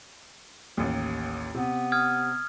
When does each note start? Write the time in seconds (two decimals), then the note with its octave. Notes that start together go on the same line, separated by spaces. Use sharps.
0.77 A1 D#2
1.54 C3 B3
1.92 D#6 F6 G#6